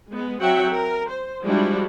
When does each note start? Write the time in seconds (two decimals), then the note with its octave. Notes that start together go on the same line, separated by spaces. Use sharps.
0.10 G#3 B3
0.40 F#3 C4 F#4 E5 F#5 G5
0.71 A#4
1.09 C5
1.44 F3 G3 G#3 D4 E4 F#4